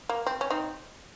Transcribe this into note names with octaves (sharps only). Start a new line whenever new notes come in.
A#3
C4
C#4
C4 D#4